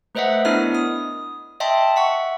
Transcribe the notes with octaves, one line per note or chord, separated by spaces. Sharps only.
A3 B4 C5 D#5 E5 F#5
B3 D4 E4 A#4 D#5 F6
D#6
D#5 E5 G5 A5 C6
E5 F#5 C#6